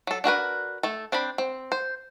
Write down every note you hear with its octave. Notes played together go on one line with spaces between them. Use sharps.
F#3 A4
D4 F#4 A#4 B4
A3 A4
C4 D4 G5 B5
C4
C5